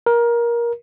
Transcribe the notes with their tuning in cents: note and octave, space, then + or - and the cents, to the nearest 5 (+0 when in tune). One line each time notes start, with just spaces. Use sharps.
A#4 +20